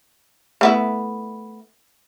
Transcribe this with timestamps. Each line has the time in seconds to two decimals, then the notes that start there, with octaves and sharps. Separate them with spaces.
0.61 A3 B3 E4